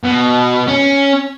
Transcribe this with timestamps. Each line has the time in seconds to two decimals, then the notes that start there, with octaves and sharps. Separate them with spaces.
0.04 B2
0.67 C#4